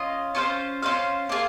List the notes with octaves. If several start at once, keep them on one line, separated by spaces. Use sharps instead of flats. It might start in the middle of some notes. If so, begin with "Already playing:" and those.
Already playing: C#4 F4 D#5
C#4 F4 C5 F5
C#4 F4 C5 F5
A#3 F4 G#4